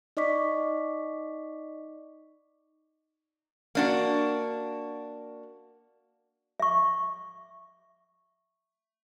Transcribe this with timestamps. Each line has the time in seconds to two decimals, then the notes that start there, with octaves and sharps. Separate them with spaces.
0.17 D#4 D5 D#5 C#6 D6 B6
3.75 A#3 D4 F#4
6.60 E5 C#6